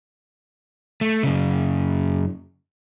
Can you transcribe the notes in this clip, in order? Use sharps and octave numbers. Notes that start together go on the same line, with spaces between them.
A3
F#2 C#3